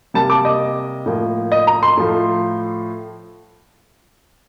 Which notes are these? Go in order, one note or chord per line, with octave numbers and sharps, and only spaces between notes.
C3 G3 A#3 A5
D6
D#5
A2 F3 A#3
D#5
A#5
C6
A2 F3 A3